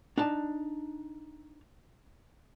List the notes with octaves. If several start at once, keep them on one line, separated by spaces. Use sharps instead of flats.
D4 D#4 A5